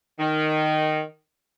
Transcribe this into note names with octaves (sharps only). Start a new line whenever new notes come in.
D#3